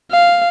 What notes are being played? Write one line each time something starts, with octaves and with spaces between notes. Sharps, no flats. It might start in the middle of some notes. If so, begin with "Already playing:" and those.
F5